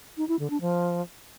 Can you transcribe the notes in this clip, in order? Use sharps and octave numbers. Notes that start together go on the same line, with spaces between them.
D#4
E4
D3
D4
F3